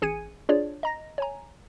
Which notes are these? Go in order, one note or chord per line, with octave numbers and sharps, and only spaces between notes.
A1 G#4 G#5 G#6 C#7 D#7
D4 F4 G#4 C#5 D5
D#5 A#5 A#6
C#5 G#5 A#5